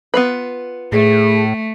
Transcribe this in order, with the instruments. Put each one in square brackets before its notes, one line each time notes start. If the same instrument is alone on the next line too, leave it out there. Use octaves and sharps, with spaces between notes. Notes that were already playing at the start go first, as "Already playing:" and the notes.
[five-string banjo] B3 F4 B4
[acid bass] A2 [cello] A3 [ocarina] G#4